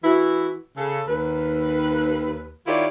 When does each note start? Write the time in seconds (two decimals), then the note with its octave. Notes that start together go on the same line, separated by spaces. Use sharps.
0.03 E3 E4 F#4
0.76 C#3 A4
1.08 D#2 B4
2.66 D#3 E4 F4 G4 C#5 D5